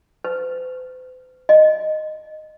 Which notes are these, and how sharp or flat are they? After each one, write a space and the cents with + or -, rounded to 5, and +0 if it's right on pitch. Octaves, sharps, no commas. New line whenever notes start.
C5 -45
D#5 -10